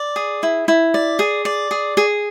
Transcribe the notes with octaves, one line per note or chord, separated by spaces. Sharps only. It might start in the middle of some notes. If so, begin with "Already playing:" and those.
Already playing: D5
G#4
E4
E4
D5
G#4
D5
G#4
G#4